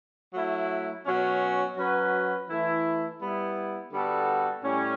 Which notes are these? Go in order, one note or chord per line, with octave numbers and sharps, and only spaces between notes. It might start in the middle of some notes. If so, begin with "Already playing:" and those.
F#3 A3 E4
B2 F#3 C#4
F#3 C#4 F#4 B4
E3 A3 E4 A4
G3 B3 E4
D3 G3 B3 F#4 A4
A2 G3 C#4